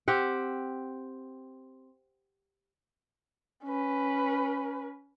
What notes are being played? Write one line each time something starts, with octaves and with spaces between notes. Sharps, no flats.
C4 G4 F#5
C#4 B4